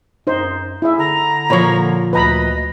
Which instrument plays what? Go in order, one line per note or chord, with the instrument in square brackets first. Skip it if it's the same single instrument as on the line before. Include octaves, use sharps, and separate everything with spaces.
[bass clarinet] F#2 [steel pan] D#4 C5
[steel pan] E4 E5 [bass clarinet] G#4
[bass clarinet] D3 [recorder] A#5
[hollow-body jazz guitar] A#2 F3 [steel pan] C#5 B5
[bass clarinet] D2 [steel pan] B4 A#5 B5 [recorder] D#5